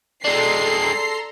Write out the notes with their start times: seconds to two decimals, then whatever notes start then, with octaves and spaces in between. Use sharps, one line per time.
0.25 G#3 D4 A4 D5 A#5 C6 C7